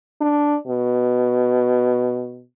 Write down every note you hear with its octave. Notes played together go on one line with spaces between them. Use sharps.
D4
B2